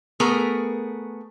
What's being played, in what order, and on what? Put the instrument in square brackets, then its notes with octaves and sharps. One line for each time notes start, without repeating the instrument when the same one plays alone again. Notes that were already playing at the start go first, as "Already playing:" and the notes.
[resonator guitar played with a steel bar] A3 B3 G#4 A#4